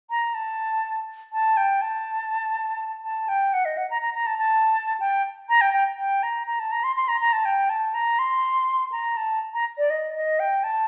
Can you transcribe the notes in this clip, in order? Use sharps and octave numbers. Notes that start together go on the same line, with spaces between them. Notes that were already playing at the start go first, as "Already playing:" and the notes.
A#5
A5
A5
G5
A5
A5
G5
F#5
D#5
F#5
A#5
A#5
A#5
A5
A5
G5
A#5
G5
G5
G5
A#5
A#5
A5
A#5
C6
C6
A#5
A#5
A5
G5
A5
A#5
C6
A#5
A5
A#5
D5
D#5
D#5
G5
A5